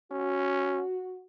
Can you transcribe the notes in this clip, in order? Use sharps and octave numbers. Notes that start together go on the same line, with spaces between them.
C#4 F#4